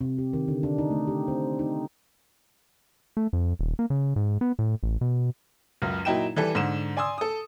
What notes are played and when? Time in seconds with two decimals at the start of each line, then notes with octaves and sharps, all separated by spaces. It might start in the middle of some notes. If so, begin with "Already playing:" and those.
0.01 C3
0.18 G4
0.33 D#3
0.48 D3
0.63 D4
0.78 D#4
0.91 A3
1.07 G4
1.28 C4
1.59 D#4
3.17 A3
3.33 F2
3.59 D#1
3.79 A#3
3.90 C#3
4.16 G#2
4.41 B3
4.59 A2
4.83 A1
5.01 B2
5.82 C#2 F#2 C#3
6.05 A#2 F#3 D#4 E4 G5 E7
6.36 E3 G3 A4
6.55 G#2 D3 E7
6.97 D5 G#5 C6 D#6 E6
7.18 A4 D#6